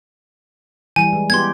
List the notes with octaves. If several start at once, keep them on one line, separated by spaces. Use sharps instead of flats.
E3 G3 G#5
G#3
B3 G4 C6 G#6